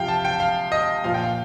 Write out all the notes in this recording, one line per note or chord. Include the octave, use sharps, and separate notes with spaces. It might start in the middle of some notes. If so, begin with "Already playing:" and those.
Already playing: C3 F3 F5 G5
A5
G5
F5
D#5
A#2 F3 F5
G5
F5